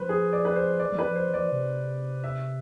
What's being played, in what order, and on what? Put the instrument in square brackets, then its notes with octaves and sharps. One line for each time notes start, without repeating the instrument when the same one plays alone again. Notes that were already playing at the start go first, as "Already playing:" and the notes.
Already playing: [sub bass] F3 [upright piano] B4 C5
[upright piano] G#4
D5
B4
C5
[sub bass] E3 [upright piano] D5
[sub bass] E3
[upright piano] B4
[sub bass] F3
[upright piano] C5
[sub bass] E3
[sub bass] F3 [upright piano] D5
[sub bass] E3
C3
[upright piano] E5